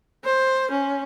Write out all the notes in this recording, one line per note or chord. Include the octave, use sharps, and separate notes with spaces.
C5
C#4